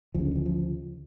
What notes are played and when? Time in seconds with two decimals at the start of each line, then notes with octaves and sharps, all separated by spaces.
0.15 D2 C#3 F3
0.25 D3
0.35 F3
0.46 F3